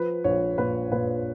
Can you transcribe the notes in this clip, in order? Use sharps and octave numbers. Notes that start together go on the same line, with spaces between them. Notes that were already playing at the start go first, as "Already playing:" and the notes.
Already playing: F3 B4
A#1 C#5
A#2 B4
A#2 B4